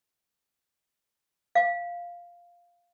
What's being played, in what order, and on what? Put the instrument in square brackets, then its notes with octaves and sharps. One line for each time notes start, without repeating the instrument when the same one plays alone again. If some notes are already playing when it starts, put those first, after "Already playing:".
[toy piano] F5